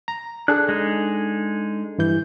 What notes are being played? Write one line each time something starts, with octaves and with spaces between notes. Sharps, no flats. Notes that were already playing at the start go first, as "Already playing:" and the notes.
A#5
D4 G#4 A4 F#6
G#3 D#4
G2 E3 G6